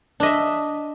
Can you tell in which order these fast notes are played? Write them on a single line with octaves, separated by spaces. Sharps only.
D4 D#5 E5